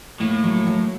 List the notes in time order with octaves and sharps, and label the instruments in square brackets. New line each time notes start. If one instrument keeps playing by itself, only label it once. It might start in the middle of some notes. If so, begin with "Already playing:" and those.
[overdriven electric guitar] A2 [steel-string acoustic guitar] A#3
[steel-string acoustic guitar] F#3
F#3